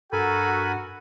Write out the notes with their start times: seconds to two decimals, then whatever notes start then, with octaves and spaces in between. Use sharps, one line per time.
0.13 G2 F#4 A4 A#4 F#5 G#5 B5